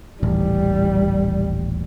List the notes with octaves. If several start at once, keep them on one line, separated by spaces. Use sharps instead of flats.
D#1 A1 G3